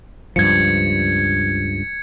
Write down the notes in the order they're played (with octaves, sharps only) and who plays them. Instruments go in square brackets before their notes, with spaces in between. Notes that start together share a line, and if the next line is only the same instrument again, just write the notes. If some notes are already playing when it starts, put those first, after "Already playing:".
[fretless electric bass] C#2 G2 F3 [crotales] G#6 C#7